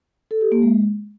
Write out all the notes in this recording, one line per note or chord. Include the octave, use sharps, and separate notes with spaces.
A4
G4
A#3
G#3